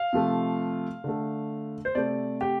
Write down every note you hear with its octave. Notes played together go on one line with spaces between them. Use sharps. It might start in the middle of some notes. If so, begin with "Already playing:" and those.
Already playing: F5
C3 F3 A3
D3 A3
C5
C3 A3 D5
G4